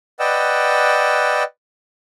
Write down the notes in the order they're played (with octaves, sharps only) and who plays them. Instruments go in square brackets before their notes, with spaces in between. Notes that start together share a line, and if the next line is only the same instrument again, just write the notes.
[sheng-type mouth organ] B4 D5 D#5 F#5 G5 E6